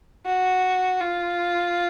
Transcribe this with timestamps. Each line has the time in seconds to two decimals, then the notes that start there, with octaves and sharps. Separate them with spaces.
0.26 F#4
1.01 F4